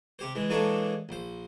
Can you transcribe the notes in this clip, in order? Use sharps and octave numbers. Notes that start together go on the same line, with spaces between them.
C3 G4 C5
E3 G#3
E3 G#3 A#3 D4 A4 C#5
A#1 C5